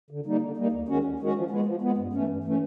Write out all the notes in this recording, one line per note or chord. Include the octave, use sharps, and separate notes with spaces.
D3
G3 A#3 D#4
D3
G3 A#3 D#4
D#2
D#3 G#3 C#4 F#4
D#2
D#3 G#3 C#4 F#4
F3
G#3 B3
F3
G#3 B3
G2
E3 A3 C#4
G2
E3 A3 C#4